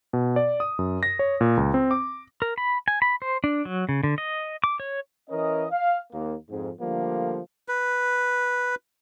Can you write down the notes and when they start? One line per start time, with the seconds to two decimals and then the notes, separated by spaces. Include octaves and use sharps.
0.13 B2
0.36 D5
0.60 D#6
0.79 F#2
1.03 A#6
1.19 C#5
1.41 A#2
1.57 C#2
1.74 C4
1.91 D6
2.42 A#4
2.58 B5
2.88 G#5
3.02 B5
3.22 C5
3.44 D4
3.65 F#3
3.89 C#3
4.03 D3
4.18 D#5
4.64 D6
4.80 C#5
5.30 E3 C#4 A#4 D#5
5.71 F5
6.13 D#2 A#3
6.50 F2 G#2
6.81 D3 F3 G3 A3 A#3
7.69 B4